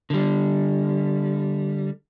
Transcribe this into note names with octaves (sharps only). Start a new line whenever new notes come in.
D3 G3